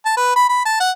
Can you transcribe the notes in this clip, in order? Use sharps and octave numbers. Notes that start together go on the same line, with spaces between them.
A5
B4
B5
B5
A5
F#5